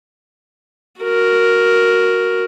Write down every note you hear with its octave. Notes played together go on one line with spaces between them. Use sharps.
F#4 A#4